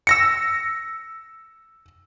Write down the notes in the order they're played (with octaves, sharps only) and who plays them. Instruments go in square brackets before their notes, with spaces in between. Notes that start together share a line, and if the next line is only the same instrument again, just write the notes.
[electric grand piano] E6 A#6 C#7